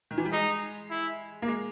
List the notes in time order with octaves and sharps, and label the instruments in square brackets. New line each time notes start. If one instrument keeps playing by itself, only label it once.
[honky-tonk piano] D#3
E3
G3
[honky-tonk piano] G#3 [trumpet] D#4
[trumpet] E4
[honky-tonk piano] A#3
G#3